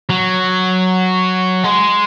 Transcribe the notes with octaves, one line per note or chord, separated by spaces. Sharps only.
F#3
G#3